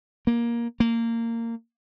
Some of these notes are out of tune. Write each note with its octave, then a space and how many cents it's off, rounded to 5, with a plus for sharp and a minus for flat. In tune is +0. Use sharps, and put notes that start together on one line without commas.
A#3 +15
A#3 -20